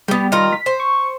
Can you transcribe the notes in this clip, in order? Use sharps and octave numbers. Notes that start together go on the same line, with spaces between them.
G3 B3 G4
D#3 F4 A#5
B6
C5
C#6